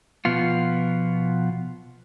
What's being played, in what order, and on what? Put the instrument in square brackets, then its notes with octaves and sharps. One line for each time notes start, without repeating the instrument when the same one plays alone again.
[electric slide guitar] B2 F3 B3 F4